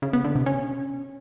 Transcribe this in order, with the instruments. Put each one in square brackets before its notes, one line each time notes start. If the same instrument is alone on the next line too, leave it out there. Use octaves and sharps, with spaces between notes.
[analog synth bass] C#3
B3
D3
C3
C#4